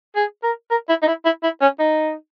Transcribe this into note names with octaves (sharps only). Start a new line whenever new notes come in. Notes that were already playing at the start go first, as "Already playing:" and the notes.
G#4
A#4
A#4
E4
D#4
E4
E4
E4
C#4
D#4